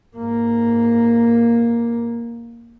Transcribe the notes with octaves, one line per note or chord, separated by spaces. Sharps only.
G#2 A#3